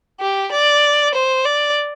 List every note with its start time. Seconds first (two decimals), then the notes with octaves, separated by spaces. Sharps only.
0.21 G4
0.52 D5
1.15 C5
1.45 D5